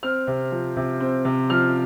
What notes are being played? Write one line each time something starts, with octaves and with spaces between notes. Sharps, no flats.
C4 F6
C3
F3
C3
C4
C3
F3 F6